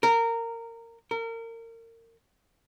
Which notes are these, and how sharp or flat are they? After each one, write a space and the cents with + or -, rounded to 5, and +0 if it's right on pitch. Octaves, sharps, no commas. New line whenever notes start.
A#4 -20
A#4 -30